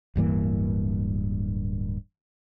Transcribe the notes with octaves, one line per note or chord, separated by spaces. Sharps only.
D1 G2 E3 A#3